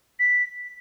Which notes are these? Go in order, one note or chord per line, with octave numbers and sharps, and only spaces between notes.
B6